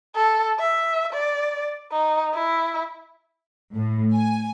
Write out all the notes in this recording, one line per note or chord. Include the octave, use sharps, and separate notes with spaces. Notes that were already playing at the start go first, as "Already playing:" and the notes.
A4
E5
D5
D#4
E4
A2
G#5